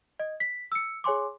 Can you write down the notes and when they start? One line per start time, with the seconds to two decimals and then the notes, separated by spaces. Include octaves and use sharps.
0.19 D#5
0.40 B6
0.72 E6 C#7
1.04 G#4 C#5 G#5 C6 D6